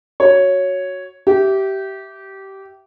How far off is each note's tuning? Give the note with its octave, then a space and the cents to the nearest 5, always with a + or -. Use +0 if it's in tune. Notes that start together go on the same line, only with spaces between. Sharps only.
F#4 +0 C#5 +0
G4 -20 E5 +0